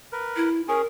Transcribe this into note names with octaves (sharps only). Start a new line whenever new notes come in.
A#4 B4
E4
C#4 G#4 A#4